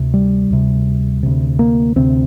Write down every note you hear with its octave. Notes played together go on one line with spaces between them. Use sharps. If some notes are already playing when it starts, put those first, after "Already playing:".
Already playing: D2 C3
G3
D2 C3
D2 C3
A#3
D2 C3 C4